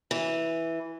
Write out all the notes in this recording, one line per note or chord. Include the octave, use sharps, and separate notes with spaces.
E3